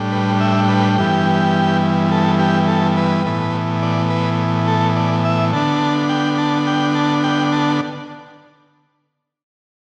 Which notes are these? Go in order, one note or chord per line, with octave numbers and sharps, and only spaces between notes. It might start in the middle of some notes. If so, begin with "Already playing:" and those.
Already playing: A2 G3 D4
B4
E5
B4
G2 E3 B3 G4
A4
G4
A4
B4
A2 E3 B3
D5
B4
A4
D5
E5
D3 B3 D4 A5
G5
A5
G5
A5
G5
A5